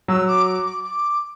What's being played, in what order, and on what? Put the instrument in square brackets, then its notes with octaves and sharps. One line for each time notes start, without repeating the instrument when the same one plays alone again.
[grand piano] F#3 [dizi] E6
[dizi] D6
D6
D6
D6